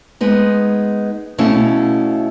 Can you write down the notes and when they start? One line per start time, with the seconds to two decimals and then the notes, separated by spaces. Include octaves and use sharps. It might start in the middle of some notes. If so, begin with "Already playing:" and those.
0.21 G#3 B3 D#4
1.38 B2 A3 C#4 E4 F5